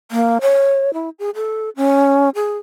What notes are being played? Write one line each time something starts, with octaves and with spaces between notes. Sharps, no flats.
A#3
C#5
E4
G#4
A4
C#4
G#4